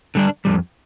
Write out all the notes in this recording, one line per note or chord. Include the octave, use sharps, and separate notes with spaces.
D3 G3 D4
F2 C3 G3